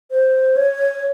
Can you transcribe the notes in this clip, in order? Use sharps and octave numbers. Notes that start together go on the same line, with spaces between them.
C5
C#5